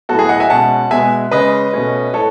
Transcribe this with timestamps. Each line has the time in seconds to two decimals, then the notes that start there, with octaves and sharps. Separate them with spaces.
0.09 A2 F#3 B3 F#4 A4
0.19 G#4
0.29 D#5 F#5
0.40 E5 G#5
0.50 B2 G#3 C#4 F#5 A5
0.91 B2 G#3 B3 E5 G#5
1.31 C#3 G#3 C#4 B4 D#5
1.74 B2 A3 C#4
2.14 A2 A4 C#5